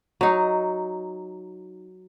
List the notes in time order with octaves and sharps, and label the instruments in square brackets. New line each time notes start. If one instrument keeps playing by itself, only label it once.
[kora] F#3 D#4